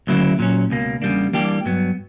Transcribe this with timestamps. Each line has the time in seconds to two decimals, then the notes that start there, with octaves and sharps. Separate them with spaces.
0.07 D2 C#3 F#3 A#3 E4
0.39 A#2 F#3 C#4
0.70 C#2 B2 A#3
1.02 E2 C#3 G3 A#3 D4
1.33 E3 G3 A#3 D4 G4
1.65 G2 F#3 B3